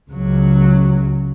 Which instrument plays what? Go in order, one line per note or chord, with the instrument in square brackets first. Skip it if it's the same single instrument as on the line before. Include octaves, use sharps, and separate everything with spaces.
[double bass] C#2 F#3